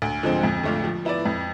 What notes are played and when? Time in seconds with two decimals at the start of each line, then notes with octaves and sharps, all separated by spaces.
0.02 D2
0.23 D3 F3 G#3 C4
0.43 F2
0.64 D3 A3 D4 F4
0.84 F3
1.05 B3 E4 B4 D5
1.25 F2